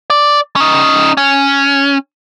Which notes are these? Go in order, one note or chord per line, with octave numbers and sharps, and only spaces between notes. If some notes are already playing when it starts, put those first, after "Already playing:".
D5
C#4 D#4
C#4